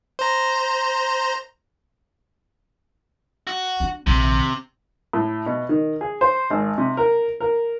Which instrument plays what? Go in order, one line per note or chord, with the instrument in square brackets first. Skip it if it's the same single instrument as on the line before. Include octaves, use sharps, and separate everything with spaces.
[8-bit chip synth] C5 A#5
[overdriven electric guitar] F#4
[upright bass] D4
[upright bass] A#1 D#3 [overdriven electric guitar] C3
[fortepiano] A2
B2
D#3
G#4
C5
G#1
C3
A#4
A#4